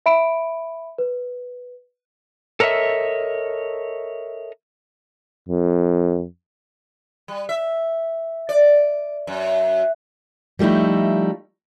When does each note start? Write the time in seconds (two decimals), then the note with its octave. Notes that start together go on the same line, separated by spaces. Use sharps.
0.06 E5 B5 D7
0.98 B4
2.60 A4 A#4 C#5 D#5 E5
5.49 F2
7.28 G3
7.49 E5
8.49 D5
9.27 F#2
10.59 F3 G3 A3 D#4 E4